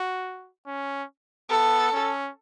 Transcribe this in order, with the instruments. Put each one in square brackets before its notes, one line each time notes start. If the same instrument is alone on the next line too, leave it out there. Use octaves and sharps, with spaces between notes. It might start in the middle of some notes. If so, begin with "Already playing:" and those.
Already playing: [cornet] F#4
C#4
[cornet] B3 [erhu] A4
[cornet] C#4